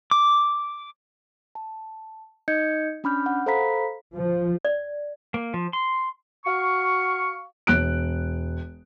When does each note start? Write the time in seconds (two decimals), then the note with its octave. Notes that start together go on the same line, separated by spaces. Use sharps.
0.11 D6
1.55 A5
2.48 D#4 D#5 G6 G#6 C#7
3.04 C#4 D4 B5 D6 F6 G6
3.26 F#5
3.46 A4 C5 F5 A#5 B5 B6
4.15 F3
4.65 D5
5.34 A#3
5.54 F3
5.73 C6
6.45 F#4 F5 C#6
7.67 E1 F#6 D7